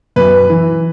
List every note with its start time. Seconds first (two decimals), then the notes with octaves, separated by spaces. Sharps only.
0.16 F#2 B4
0.50 E3